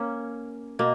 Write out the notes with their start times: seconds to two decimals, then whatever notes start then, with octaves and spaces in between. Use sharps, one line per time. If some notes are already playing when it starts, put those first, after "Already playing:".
Already playing: A#3 C#4
0.79 B2 A#3